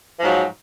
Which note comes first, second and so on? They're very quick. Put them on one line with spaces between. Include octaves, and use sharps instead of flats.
F3 G#2 F#3